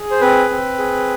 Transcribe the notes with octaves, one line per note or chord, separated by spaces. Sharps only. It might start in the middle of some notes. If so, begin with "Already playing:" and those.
Already playing: G#4
C5
C4 B4
C4
G#4